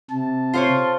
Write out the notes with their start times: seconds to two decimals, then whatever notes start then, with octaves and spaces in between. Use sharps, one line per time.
0.11 C3 A5
0.54 F4 C5 C#5